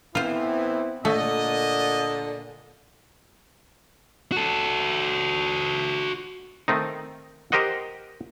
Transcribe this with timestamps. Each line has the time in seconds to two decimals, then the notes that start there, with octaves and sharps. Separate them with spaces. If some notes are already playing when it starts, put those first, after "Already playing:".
0.15 A2 E3 B3 C4 E4 F4 C5
1.05 A#2 D3 A3 D#5
4.32 F#4 A4
6.68 D#3 A3 C4 D#4
7.52 G4 A#4 C5 D#5 F#5